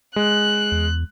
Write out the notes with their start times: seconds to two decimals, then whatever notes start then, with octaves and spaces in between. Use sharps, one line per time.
0.16 G#3 F#6
0.72 E2